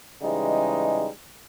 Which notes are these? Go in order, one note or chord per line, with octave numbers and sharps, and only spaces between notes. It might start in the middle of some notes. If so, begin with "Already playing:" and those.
C#3 E3 G3 G#3 D#4